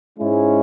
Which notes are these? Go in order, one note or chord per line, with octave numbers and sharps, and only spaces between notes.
G#2 G#3 C#4 E4